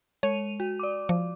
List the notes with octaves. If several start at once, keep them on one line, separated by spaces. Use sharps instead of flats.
G#3 C#5 D#7 F7
F#4
D5 D6
F3